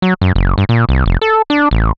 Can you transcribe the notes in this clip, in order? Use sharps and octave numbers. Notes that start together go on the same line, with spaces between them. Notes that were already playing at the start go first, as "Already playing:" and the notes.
F#3
F#2
F#1
G2
A#2
C2
F1
A4
D4
A1